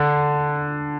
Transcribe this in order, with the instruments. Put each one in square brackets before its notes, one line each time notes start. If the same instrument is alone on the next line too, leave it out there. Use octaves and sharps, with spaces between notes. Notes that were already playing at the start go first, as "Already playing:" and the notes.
Already playing: [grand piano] D3